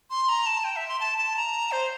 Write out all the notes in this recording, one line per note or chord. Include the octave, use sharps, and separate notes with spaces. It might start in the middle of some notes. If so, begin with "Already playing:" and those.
C6
A#5
A5
G5
E5
C6
A5
A5
A#5
C5